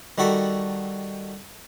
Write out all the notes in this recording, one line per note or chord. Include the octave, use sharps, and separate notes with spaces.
D#3 G3 F#4 A4 B5